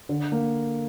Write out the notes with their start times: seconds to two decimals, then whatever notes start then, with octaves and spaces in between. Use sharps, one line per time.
0.09 D3
0.32 A#3